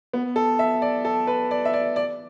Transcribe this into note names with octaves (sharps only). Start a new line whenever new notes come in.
B3
A4
E5
D5
A4
B4
D5
E5
D5
D5